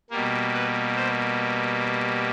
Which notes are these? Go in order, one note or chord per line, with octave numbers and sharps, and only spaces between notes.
B2 G3 A#3 A#4
B4
C5